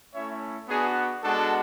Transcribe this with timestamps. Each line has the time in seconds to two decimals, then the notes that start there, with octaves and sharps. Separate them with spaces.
0.13 A3 C#4 E4 C#5 E5
0.68 B3 D4 F#4 G#4
1.22 G#3 B3 D4 F#4 A4